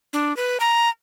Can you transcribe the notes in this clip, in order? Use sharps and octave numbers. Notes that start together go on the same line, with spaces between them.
D4
B4
A#5